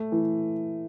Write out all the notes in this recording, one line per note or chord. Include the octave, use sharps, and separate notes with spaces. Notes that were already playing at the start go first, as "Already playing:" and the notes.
Already playing: A3
E3